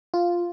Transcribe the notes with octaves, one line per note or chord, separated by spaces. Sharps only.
F4